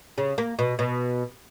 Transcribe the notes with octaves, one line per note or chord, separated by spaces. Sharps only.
C#3
A#3
B2
B2